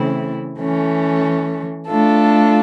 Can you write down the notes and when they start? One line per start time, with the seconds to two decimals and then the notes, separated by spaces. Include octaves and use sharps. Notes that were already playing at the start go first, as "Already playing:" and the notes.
Already playing: C#3 E3 A3 C4 E4
0.59 E3 A3 C#4
1.88 A3 D4 F4 A4